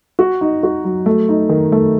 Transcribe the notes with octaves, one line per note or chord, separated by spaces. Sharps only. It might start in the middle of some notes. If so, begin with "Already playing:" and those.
F#4
D#4
F#4
F#3
A3
D#4
D#3
A3